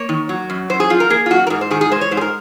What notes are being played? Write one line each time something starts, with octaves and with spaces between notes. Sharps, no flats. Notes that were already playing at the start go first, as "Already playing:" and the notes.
Already playing: A#3 C#5
D#3
F#3
F#2
F#2 C5
G#4
F3 F4
A#4
A#3 G#4
F4
F#2 F#4
A#4
G#2 G#4
C5
D#3 G#4
G#4
G#3 C5
C#5
G#2 C5
G#4
A#4